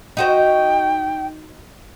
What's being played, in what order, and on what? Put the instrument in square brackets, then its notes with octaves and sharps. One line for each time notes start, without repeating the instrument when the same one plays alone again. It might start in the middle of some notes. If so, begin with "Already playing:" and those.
[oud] D#4 F#4 C5 [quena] G5